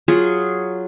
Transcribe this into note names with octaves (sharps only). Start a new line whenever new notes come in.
F#3 F4 G#4 C#5